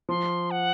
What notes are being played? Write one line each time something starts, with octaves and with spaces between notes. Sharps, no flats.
F3 C6
F#5